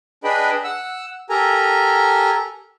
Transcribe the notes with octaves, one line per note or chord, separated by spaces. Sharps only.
D4 G#4 B4 D#5 G5 B5
F#5 E6
G4 A4 A#4 G#5 A#5